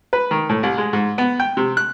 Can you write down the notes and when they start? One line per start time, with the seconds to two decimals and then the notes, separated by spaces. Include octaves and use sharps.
0.13 B4
0.31 D#3
0.49 A2
0.63 C2
0.78 G#3
0.93 G#2
1.18 B3
1.40 G5
1.57 C3
1.77 F#6